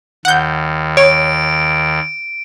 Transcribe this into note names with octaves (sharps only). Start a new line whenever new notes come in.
D#2 F#5 G6
C#5 D7